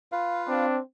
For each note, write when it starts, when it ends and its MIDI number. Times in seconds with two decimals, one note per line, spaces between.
0.12 0.66 65
0.12 0.66 71
0.12 0.66 77
0.48 0.78 60
0.48 0.79 62